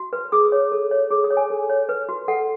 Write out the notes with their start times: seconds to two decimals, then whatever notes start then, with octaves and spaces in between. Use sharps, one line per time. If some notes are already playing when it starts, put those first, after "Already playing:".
Already playing: F#4
0.13 B4
0.32 G#4 D#6
0.52 C#5
0.72 A4
0.91 C#5
1.11 G#4
1.24 D#6
1.30 C#5
1.37 G#5
1.50 A4
1.69 C#5
1.89 B4
2.09 F#4
2.28 A4 F#5